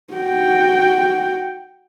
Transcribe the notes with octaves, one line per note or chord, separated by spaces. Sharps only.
F#4 G5